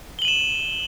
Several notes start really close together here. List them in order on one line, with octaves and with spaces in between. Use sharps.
G7 F#7 D#7 E7